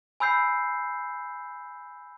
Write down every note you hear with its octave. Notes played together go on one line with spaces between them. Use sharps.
G#5 B5 E6 G6 C7